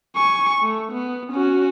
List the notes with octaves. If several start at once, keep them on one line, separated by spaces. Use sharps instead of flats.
G#5 C#6
A3
B3
C#4 F#4